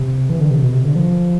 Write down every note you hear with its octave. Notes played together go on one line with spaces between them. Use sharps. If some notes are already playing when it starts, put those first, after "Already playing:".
Already playing: C3
E3
D3
C3
B2
C3
D3
F3